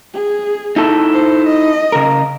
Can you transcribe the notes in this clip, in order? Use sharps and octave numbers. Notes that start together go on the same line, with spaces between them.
G#4
D#4 E4 A4
C5
D#5
C#3 A#4